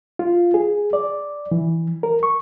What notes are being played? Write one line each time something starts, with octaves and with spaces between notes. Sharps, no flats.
F4
G#4
D5
E3
A#4
C#6